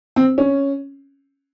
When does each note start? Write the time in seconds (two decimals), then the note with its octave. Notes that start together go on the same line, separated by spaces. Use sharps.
0.16 C4
0.38 C#4